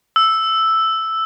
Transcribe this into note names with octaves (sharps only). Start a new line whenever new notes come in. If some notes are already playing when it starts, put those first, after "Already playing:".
E6